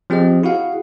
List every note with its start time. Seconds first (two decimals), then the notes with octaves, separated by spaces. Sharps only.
0.10 F3 C4 G4 G#4 D#5
0.43 E4 F#4 G#4 F5 F#5